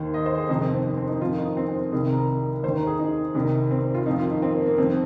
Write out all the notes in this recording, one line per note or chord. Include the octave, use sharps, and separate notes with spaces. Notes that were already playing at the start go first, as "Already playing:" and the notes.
Already playing: D#2 D#3 C5
D#5
C5
G#4
F2 C3 D#3 D#4
C4
C4
C4
C4
D#4
F2 D#3 F4
D#4
C4
C4
C2 C3 D#3 G#4
A#4
D#2 C5
D#3
A#4
G#4
D#4
C2 C3 D#3
C4
F4
F2 D#3 D#4
F4
D#4
C4
A#3
A#3
F2 D#3 C4